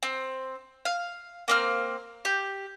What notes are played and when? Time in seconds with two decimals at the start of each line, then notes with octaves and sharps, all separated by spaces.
0.03 C4
0.85 F5
1.48 A#3 C4 F6
2.25 G4